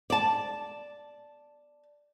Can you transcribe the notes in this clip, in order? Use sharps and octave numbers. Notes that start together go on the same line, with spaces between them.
D5 A5